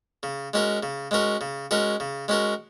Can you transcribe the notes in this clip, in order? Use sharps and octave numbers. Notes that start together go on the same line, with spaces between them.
C#3
G#3 C#4 F#4 A#4
C#3
G#3 C#4 F#4 A#4
C#3
G#3 C#4 F#4 A#4
C#3
G#3 C#4 F#4 A#4